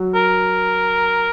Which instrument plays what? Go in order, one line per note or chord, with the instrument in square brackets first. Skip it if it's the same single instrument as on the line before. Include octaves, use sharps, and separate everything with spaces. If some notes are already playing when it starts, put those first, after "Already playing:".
Already playing: [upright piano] F#3 F#4
[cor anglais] A#4